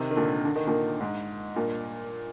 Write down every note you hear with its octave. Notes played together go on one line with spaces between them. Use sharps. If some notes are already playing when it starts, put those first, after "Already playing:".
Already playing: C3 D#3
D#3
A#2 D3
D3
D#3
A#2 D3
G#2
G2 A#2